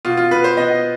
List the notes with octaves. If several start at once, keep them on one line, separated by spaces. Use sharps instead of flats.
B2 F4
F4
B2 B4
C5
B3 D#5